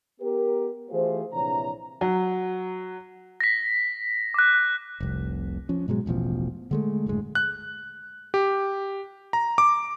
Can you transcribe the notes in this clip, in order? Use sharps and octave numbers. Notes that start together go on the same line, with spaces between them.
B3 G4 A#4
E3 A3 F4 G4 G#4 C5
A#1 C3 E3 D4 C#5 A#5
F#3
A#6 B6
D6 F#6
F1 C2
F3 C#4
G#2 B2 F#3 G#3
E1 A1 B2 F3
D3 G#3 A3
F#1 D2 A2 G#3
F#6
G4
A#5
D6